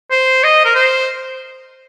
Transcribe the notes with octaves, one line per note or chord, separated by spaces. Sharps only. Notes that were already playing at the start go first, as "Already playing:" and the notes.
C5
D#5
A#4
C5